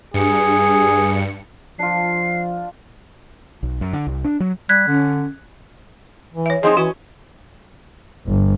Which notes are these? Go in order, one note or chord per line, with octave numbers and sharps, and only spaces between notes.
G2 G#4 C#7
F3 D4 F4 C7
B1
F#2
D3
C2
D4
F#3
G3 F#6 G#6 B6
D3 C#4
E3
C#5 E5
F3 C4 D#4 G#4 D#5
E3 C#4 F#4
G1